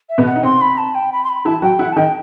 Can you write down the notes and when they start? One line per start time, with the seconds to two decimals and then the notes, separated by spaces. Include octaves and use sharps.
0.09 E5
0.18 B2 B3
0.26 F#5
0.36 D#4
0.43 C3 C4 C6
0.61 B5
0.77 A5
0.95 G5
1.12 B5
1.24 C6
1.29 B5
1.45 E3 E4 A5
1.62 F#3 F#4 G5
1.79 E3 E4 F#5
1.92 A5
1.96 D#3 D#4 G5